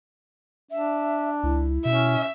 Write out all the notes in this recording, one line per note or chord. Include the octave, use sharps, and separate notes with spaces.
D4 E5
C#2 E4
B2 C#4 E5